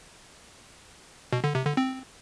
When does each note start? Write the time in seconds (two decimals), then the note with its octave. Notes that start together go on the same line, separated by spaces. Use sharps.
1.33 B2
1.44 D3
1.55 C3
1.66 D3
1.77 C4